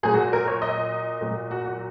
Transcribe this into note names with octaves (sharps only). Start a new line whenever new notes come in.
A#2 F#3 G#4
F#4
A#4
C#5
D#5
A#2 F#3
F#4
F#4